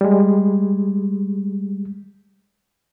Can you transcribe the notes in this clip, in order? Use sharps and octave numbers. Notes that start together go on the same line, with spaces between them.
G3 G#3